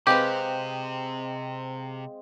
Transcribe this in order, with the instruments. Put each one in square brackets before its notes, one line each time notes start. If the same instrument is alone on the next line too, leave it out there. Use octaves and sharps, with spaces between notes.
[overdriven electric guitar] C3 [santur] G#3 C4 F5 [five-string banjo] G4 B4